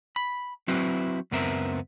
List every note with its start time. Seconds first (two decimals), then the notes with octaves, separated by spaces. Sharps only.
0.16 B5
0.68 F#3 C4 E4 F#4 B4
1.31 C#2 F#2 B3 C4 A#4 E5